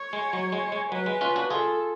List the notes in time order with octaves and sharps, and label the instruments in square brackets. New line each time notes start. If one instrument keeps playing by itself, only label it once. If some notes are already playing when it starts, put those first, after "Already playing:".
Already playing: [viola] C#5
[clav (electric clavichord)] G#3
F#3
G#3
G#3
[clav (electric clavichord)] F#3 [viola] B4
[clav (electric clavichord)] G#3
C#4 F4
D4 F#4
[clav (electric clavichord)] F4 G#4 [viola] A4